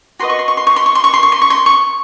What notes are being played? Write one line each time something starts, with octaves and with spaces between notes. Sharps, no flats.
F#4 B4 D#5 C6
C#6
C6
C#6
C6
C#6
C6
C#6
C6
C#6
C6
C#6
C6
C#6
C6
C#6